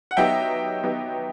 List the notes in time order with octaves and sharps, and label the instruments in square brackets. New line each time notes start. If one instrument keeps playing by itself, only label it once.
[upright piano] F#5
[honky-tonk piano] F#3 B3 D#4 G4 [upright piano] E5 G5
[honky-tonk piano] F#3 B3 D#4 G4